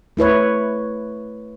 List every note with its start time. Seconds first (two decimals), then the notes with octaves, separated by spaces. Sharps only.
0.17 A3 E4 B4 C#5